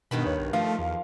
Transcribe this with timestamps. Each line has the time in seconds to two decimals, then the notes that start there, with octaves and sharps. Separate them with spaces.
0.11 G2 B2 D#3 B5
0.26 D#2 C#5
0.39 B1
0.53 F3 A3 F5
0.79 E2